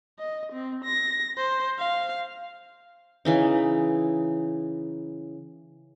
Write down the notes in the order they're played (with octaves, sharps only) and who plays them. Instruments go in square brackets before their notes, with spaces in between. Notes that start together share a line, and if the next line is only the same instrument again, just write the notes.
[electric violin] D#5
C4
A#6
C5
F5
[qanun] C#3 E3 D#4